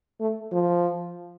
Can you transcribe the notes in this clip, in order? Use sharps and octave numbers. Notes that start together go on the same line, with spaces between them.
A3
F3